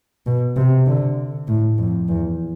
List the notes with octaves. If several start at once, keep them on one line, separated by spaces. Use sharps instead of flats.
B2
C3
D3
A2
F2
E2